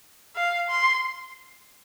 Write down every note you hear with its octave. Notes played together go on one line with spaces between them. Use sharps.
F5
C6